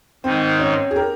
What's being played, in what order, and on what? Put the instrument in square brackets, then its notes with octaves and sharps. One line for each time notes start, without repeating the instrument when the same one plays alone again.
[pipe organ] G#2 D#3 G#3 D#4 [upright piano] C4
[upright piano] C#4
G#4
G4 A#4